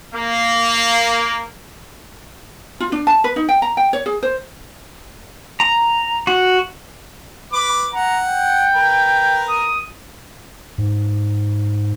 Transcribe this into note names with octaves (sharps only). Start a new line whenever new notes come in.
A#3
F4
D4
A5
B4
D#4
G5
A#5
G5
C#5
G#4
C5
A#5
F#4
B4 D6
F#5 A#5
G5
A#4 B4
D#6
G#2